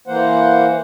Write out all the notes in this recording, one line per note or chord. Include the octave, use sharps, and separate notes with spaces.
E3 A#3 C5 F#5